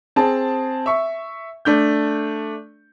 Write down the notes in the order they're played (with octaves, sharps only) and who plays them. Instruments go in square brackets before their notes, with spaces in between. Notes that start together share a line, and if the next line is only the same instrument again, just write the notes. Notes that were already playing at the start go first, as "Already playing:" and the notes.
[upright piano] C4 G#4 A5
E5 C#6
A3 D4 G6